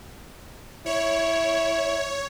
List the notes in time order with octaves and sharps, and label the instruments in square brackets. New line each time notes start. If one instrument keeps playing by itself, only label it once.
[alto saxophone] E4 [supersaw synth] C#5